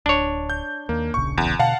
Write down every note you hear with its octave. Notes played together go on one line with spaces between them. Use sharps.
D1 D4 C#5
G6
D#2 A#3
D1 A#1 C#3 C#6
E2
B2 D3 F5 F#5 A5